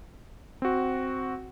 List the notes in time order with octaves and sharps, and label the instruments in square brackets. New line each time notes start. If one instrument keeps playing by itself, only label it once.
[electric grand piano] C4 F#4